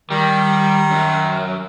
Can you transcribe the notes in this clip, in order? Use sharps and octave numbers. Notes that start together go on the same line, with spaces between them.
D#3 G3
F#2